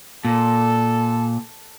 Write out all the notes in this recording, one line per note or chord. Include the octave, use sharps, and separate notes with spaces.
A#2 A4